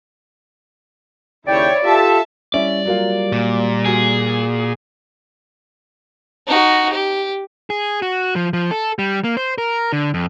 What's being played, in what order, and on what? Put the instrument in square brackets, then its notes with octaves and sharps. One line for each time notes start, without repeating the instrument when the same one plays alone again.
[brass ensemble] D#2 C#3 G5 [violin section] E4 C#5 [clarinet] D5
[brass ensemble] F4 G4 A4 [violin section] E5 A5
[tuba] G3 [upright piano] C#4 E4 [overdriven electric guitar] D5
[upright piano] F#3 A#3 F4
[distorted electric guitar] A#2
[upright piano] F#4 [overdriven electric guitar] G#4
[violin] D#4 F#4
G4
[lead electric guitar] G#4
F#4
F3
F3
A4
G3
A#3
C5
A#4
D3
F2